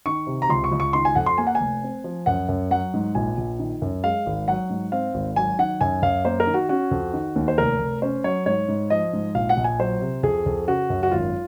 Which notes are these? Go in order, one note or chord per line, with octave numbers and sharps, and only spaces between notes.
D#3 C#6
C3
A#5
C#2 C6
C#6
C#2
C#6
D#3 C6
G#5
F2 F#5
C6
A#3 G#5
F#5
G#5
F1
C4
F3
F#2 F#5
F#2
F#3 F#5
G#2
A#1 G#5
A#1
D#3
F#2
G#3 F5
G#1
F#3 F#5
G#2
C4 F5
G#1
F#3 G#5
D#3 F#5
F#2 G#5
F#2 F5
A#3 C5
A#4
D#3
F#4
C#4 F#4
F2
D#3
D#2
C5
F1 A#4
F1
C#4 C5
F#3 C#5
G#2 C#5
G#2
F3 D#5
G#2
A#1 F5
F#5
A#1
G#5
F#3 C5
C3
F2 G#4
F2
C#3 F#4
F#2
F#4
G#1 F4